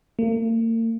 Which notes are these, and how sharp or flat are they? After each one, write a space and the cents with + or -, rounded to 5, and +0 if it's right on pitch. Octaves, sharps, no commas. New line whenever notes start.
A#3 -45